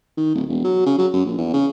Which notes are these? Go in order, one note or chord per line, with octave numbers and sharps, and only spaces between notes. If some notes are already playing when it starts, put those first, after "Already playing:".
D#3
D1
E1
F#3
C#3
F#3
F#2
A#1
E2
C#3